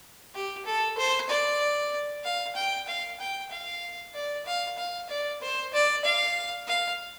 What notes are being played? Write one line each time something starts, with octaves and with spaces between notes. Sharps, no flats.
G4
A4
C5
D5
F5
G5
F5
G5
F5
D5
F5
F5
D5
C5
D5
F5
F5